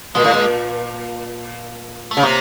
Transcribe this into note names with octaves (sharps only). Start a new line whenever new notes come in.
A#2 G#3
A2
A#2
A3
C#3
C3 A#3